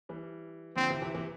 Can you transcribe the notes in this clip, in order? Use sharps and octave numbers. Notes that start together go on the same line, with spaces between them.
E3 G3
D3 F3 C4
C3 E3
C3 E3
C3 E3